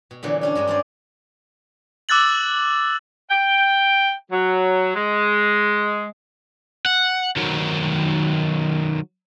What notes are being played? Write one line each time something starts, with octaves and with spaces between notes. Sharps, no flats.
B2
A#2 D3 E3 F#3 B3
A3 C#4 D4
G2 F#3 G#3 D#5
C4 C#4 G4 G#4 C5 D5
D6 E6 F#6 A6 F#7
G5
F#3
G#3
F#5
D#3 F#3